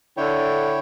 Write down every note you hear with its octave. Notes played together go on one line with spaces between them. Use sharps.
D3 E4 C#5 G5